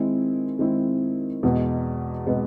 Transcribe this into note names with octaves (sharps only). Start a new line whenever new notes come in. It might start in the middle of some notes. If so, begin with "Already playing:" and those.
Already playing: D#3 G#3 C4 E4
D#3 G#3 C4 E4
E2 B2 G#3 B3
B2 G#3 B3